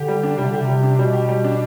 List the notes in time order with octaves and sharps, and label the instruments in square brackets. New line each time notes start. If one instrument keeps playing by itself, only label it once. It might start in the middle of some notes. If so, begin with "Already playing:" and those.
Already playing: [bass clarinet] D3 [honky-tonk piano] G4
[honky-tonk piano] G3
D4
[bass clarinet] C3 [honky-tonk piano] G3
[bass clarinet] D3 [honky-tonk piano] G4
[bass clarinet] C3
[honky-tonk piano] G3
D4
[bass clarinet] B2 [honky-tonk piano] G3
[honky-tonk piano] G4
G3
D4